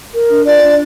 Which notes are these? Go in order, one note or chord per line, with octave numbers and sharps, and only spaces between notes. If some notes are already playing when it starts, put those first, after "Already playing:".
A#4
D4
F4 D5
D4